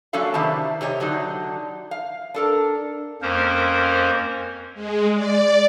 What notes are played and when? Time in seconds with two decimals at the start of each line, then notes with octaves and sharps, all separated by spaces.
0.13 F#3 A#3 C#4 D4 A4 F5
0.34 C3 D#3 E4 G4 A5
0.81 C3 G4 C#5 D#5
1.00 D3 F#3 D4 D#4
1.91 F5
2.34 D4 A4 A#4
3.22 F2 A#3 C#4 A#4 C5
4.74 G#3
5.15 D5